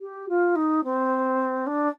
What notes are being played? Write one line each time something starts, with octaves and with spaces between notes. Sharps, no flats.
G4
F4
D#4
C4
D4